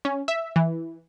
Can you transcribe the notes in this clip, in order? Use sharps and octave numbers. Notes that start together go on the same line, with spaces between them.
C#4
E5
E3